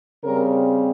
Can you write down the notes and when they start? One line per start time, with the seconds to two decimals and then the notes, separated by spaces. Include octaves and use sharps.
0.24 C#3 G3 C4 A#4